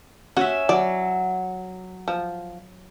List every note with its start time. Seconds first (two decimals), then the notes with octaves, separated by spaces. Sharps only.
0.37 C#4 F#4 E5
0.69 F#3 D5
2.08 F3